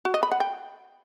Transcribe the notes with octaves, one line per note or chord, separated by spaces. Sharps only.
F#4
D#5
B5
F#5
G5